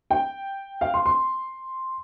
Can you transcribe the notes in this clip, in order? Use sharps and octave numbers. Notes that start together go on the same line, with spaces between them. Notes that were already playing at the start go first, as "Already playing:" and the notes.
G5
F5
C6
C6